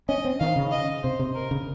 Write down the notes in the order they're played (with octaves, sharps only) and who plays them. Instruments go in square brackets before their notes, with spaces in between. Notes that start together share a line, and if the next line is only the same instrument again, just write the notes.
[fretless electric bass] C#4 [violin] D#5
[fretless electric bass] C4
[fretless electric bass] D#3 [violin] F5
[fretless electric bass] C#3
[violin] D#5
[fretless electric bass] C3 [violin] C5
[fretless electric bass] C3
[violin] A#4
[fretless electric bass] C#3